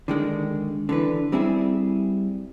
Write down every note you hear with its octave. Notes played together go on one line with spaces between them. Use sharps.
D3 D#3 G#3
D3 E3 B4
G3 C4 E4 G#4